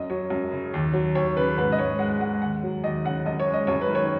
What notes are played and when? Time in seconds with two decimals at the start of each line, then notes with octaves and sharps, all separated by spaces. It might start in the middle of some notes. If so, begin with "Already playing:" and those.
Already playing: F#2 D#5
0.10 F#3 C#5
0.30 F#2
0.52 C#3
0.74 D#2
0.93 F#3
1.15 D#2 C#5
1.36 C#3 B4
1.57 G#2 B4
1.72 D#5
1.78 G#2 C#5
1.99 G#3 F#5
2.20 G#3 F#5
2.42 D#2 F#5
2.63 F#3
2.83 D#2 D#5
3.05 C#3 F#5
3.26 F#2 D#5
3.40 C#5
3.48 G#3
3.54 D#5
3.67 F#2 C#5
3.81 B4
3.89 D#3
3.95 C#5